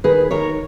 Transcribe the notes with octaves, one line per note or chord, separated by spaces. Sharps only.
D#3 G#4 B4
D#3 A#4 C#5